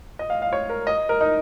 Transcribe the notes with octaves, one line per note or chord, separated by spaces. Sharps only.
D#5
F5
F5
C#5
A#4
D#5
A#4
D#4